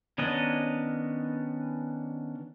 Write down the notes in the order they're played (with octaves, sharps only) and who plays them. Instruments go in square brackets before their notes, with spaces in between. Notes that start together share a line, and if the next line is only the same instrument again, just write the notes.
[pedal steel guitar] D#3 B3 C#4 D4 D#5